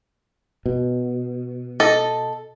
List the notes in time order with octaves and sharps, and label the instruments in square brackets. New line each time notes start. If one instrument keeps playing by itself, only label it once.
[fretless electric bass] B2
[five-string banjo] A4 D#5